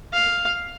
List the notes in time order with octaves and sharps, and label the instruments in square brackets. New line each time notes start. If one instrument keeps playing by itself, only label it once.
[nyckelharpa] F5